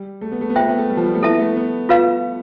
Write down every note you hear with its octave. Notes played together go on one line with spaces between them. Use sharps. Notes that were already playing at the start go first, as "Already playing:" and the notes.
Already playing: G3
A3
B3
A3
B3
A3 F4 C5 E5 G5
B3
A3
G3
F3
G3
A3
B3 E4 A4 E5 A5
A3
B3
F4 B4 F5